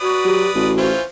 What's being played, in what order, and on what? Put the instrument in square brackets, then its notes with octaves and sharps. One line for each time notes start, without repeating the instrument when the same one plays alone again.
[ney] F#4 [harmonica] B4 D5 D#6
[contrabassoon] F#3 [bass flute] G4
[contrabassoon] A1 [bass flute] F#4
[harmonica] E3 C#4 F4 [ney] C5